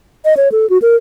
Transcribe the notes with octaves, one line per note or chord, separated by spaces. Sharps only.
D#5
C#5
A4
F#4
A#4